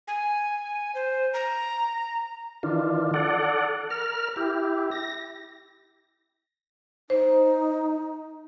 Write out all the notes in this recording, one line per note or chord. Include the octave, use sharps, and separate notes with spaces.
G#5
C5
A#5
D#3 E3 D4 F4
A4 D5 F#5
A#4 F6
E4 G4
A#6
D#4 C5